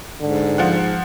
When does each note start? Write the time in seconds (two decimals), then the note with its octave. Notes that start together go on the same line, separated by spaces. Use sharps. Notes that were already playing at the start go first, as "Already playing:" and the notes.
0.21 G#2 D3
0.58 F3 F#5